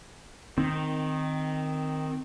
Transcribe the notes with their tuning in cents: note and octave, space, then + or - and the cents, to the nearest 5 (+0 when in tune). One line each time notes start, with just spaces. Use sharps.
D#3 -5 C4 +0